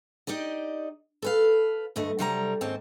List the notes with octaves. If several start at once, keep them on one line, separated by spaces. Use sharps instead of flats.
D#4 G4 D5 D#5
A4 B4 F5
D2 G2 A3 D#5
C3 F#3 G3 A4 D5 A#5
D#2 G#2 C4 C#4 A5